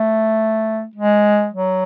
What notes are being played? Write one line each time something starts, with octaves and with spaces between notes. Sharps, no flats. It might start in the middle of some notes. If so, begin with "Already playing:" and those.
Already playing: A3
G#3
F#3